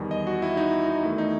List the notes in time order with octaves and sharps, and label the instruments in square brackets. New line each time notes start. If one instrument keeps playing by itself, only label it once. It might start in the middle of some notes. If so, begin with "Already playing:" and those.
Already playing: [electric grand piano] E2 D#3 G3
D#5
F#4
E4
D#4
D#4
E2 D#3 A3 E4
D#4